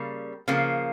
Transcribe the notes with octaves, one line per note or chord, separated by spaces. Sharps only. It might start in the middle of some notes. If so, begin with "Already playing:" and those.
Already playing: C#3 G3 A#3
C#3 F3 A#3